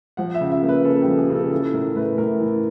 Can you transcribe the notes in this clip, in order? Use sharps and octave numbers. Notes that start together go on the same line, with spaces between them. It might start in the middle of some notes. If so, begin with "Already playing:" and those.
F3 F#5
E5
C#3
E5
A#3
B4
C#3 A4
G4
F3
G#4
C#3
A4
E3 A4
A2 A#4
A3 B4
A2 A#4
E3